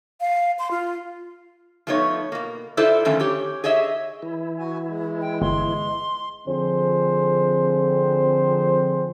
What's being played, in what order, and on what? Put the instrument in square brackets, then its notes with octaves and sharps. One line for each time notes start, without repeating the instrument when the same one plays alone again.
[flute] F5
C6
F4
[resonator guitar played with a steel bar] F3 A3 B3 D#4 C#5
B2 A#3
E4 F4 A4 C5 D5 E5
D3 D#3 F3 A3 C#4
G4 C#5
G#4 C#5 D#5 E5
[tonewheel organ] E3 E4
[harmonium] F#4 G#5
G#3
[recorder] G5
[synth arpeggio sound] G1 [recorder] C6
[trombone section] F2 D3 F3 C4 G#4 C5